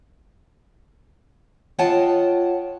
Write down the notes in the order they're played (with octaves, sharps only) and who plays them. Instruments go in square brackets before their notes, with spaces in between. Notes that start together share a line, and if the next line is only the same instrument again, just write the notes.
[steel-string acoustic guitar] F4 C#5 D#5 F#5 G5 A5